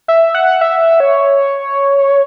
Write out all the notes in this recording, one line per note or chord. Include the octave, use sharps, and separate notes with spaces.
E5
F#5
E5
C#5